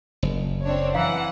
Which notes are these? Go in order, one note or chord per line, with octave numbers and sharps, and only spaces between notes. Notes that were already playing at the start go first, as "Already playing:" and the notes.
F#1
C4 D4 C#5
E3 E4 F5 F#5